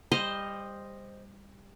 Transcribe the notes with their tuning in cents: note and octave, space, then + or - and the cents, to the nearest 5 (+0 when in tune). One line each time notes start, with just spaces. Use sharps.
G3 +25 C5 +0 D#5 +0